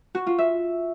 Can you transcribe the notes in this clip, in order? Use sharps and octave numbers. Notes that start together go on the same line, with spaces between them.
F#4
F4
E5